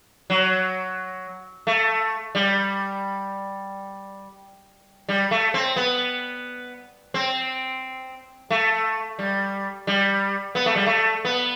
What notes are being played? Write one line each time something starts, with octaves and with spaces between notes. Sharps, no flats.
F#3
A3
G3
G3
A3
C4
B3
C4
A3
G3
G3
B3
A3
G3
A3
B3